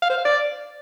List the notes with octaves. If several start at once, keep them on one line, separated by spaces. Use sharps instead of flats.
F5
C5
F5
D5